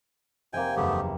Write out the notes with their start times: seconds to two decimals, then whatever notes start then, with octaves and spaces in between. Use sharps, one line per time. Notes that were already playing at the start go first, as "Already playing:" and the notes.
0.53 F1 A#3 C4 E5 G5 G#5
0.76 F#1 E2 A3 B3 G4